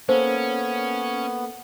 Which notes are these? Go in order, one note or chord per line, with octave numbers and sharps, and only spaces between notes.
A#3 B3 C#4 A4 C5